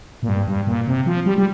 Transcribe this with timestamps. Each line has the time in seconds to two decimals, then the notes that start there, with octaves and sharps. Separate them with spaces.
0.23 A#2
0.29 G2
0.48 G2
0.67 A#2
0.87 C3
1.06 F3
1.26 G3
1.38 G3